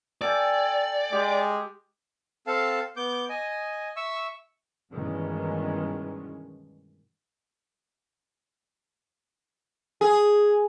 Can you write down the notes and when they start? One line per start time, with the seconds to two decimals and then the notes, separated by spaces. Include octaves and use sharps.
0.21 A4 D5 G5 G#5
1.12 G#3 G4
2.47 C4 A4 F5 A5
2.97 B3 D6 G6
3.29 D#5 G#5
3.96 E5 C#6 E6
4.92 G2 B2 D#3 E3 G#3 C#4
10.01 G#4